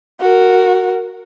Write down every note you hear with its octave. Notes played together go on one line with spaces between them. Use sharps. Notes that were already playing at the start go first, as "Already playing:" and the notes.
F#4 A#4